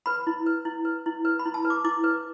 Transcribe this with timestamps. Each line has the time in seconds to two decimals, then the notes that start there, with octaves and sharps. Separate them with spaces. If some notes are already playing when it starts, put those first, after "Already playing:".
0.06 B4 B5
0.27 E4
0.46 B4
0.65 E4
0.85 B4
1.06 E4
1.25 B4
1.39 B5
1.46 E4
1.54 A5
1.65 B4
1.70 D6
1.84 E4 D6
2.04 B4